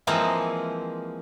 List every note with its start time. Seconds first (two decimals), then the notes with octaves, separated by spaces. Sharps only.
0.07 E3 F3 G#3 A#3 C4